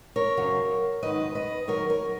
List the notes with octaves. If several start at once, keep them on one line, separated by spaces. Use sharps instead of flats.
A#4 C#5
F#2 C#3 F#3
G#2 D#3 F#3 B4 D#5
B4 D#5
F#2 D#3 F#3 A#4 C#5
A#4 C#5